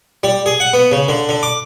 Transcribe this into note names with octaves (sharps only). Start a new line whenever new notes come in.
G3
G#4
F#5
B3
C#3
D3
D3
D6